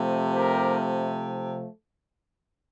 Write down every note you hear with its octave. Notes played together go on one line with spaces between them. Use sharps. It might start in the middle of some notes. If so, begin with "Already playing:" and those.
Already playing: C3 F3 A3
G4 A#4